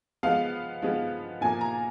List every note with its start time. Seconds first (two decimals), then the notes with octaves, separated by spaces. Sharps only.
0.23 F3 G#3 B3 F5
0.82 F3 G#3 B3
1.41 A#2 F3 A#3 G#5
1.61 A#5